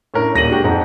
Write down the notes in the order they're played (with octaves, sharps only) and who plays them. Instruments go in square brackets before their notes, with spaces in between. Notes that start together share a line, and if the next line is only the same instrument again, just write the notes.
[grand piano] A2 C#4 D4 A#4
D#1 A#6 D#7 F#7
G#3 D4 F#4 G4
F2 G#2 C4 F#5 A#5